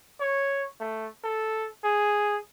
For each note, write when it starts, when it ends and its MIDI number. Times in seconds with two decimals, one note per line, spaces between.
0.20 0.65 73
0.80 1.07 57
1.24 1.69 69
1.84 2.38 68